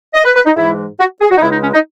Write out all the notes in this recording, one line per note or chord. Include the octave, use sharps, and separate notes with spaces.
D#5
B4
B4
D#4
G#2 E3 G#3 E4
F#4
G#4
F#4
D#4
C#2 C#3 G#3 E4
D#4
C#4
D#4